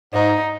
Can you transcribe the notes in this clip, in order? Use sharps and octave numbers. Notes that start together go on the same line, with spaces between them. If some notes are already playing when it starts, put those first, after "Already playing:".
G#2 D#4